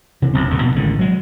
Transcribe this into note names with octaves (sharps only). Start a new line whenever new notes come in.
C3 E3
F#1 B1 B2 C4
D#1 D#2 G#2 D3
B2 A#3
A1 D3 D#3 G#3
F#3 G#3